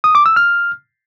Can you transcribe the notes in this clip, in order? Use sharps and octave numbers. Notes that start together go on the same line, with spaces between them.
D#6
D6
E6
F6